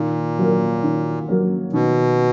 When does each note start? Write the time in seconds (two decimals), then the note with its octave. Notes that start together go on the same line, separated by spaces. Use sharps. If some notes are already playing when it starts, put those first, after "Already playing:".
Already playing: A#2 D#3
0.38 F#3 A#3
0.83 D#3
1.29 F#3 A#3
1.73 B2 D#3